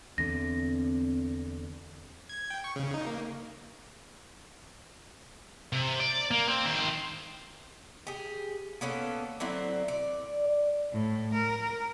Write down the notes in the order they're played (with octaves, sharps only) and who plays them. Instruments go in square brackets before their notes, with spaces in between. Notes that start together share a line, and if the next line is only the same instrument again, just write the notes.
[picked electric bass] E2 D3 [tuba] C4 [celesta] A#6
[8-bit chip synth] G#6
G5
C#6
C#3
D#4
A#3
[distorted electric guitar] C3
D5
A#3
C4
D#3 C5
[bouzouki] G4 G#4
A#3 B3 C#4 A4
D3 F#3 C4 E4
D5
[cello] A2
A#4